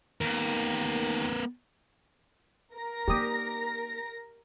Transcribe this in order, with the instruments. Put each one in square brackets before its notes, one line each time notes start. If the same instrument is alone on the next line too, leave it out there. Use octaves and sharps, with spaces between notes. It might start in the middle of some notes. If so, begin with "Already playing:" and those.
[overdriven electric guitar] D#2 [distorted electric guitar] B3 A#4
[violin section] A#4 A#6
[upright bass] A#3 D#4 [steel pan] G4 D#6